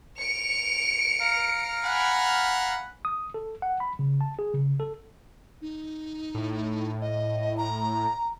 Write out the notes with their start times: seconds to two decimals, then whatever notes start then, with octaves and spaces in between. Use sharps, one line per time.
0.19 C#7 D7 F7
1.20 F5 A#5 F6
1.85 F#5 G#5 B5
3.05 D#6
3.34 A4
3.62 F#5
3.80 B5
3.99 C#3
4.21 A5
4.39 G#4
4.54 C#3
4.80 A4
5.61 D#4
6.34 A2
7.01 D#5
7.57 A#5